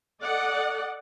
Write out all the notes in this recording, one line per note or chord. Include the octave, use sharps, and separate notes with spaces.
A4 D5 D#5 F#5